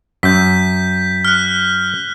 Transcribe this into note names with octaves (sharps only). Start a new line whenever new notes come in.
F#2 G6 B6
F6 F#6